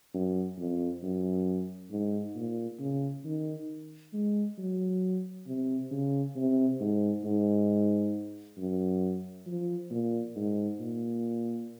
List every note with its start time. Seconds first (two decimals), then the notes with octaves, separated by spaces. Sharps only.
0.14 F#2
0.57 F2
1.03 F#2
1.91 G#2
2.35 A#2
2.79 C#3
3.25 D#3
4.13 G#3
4.58 F#3
5.46 C3
5.91 C#3
6.36 C3
6.80 G#2
7.24 G#2
8.57 F#2
9.46 F3
9.91 A#2
10.36 G#2
10.79 A#2